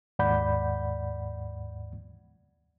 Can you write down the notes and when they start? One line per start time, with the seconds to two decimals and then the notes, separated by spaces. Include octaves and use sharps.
0.19 D#2 G#2 D5 F#5 B5 G6